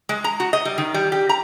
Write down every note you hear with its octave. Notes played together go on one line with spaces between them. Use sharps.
G#3
A#5
F#4
D#5
G3
D#3
G3
G4
A#5